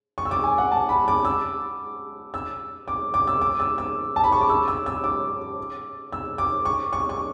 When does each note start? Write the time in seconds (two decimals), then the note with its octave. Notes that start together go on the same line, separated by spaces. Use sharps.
0.18 C#6
0.25 E6
0.31 D6
0.44 G#5
0.58 F#5
0.72 A5
0.89 B5
1.08 D6
1.25 E6
2.34 E6
2.88 D6
3.14 D6
3.27 E6
3.41 D6
3.60 E6
3.78 E6
4.16 A5
4.24 B5
4.32 C#6
4.41 D6
4.49 E6
4.68 E6
4.86 E6
5.04 D6
6.13 E6
6.38 D6
6.65 C#6
6.93 C#6
7.09 C#6